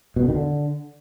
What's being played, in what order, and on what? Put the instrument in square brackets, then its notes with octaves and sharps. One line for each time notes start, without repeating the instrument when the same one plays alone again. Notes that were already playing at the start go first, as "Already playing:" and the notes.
[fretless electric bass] B2
D3
D#3
D3